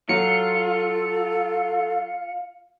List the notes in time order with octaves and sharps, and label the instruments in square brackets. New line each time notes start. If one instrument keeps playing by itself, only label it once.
[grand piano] F#3 [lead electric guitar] F4 [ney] A4 [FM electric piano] C#7